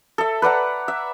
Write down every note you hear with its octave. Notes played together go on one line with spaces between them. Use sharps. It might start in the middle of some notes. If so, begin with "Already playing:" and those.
A4 E5
B4 D5 F#5 A#5
E5